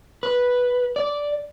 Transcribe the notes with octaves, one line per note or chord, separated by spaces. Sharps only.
B4
D5